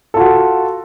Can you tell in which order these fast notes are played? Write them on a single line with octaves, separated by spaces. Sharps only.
A4 F4 F#4